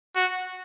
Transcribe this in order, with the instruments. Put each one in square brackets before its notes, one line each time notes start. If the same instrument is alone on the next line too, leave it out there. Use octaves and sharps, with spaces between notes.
[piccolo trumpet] F#4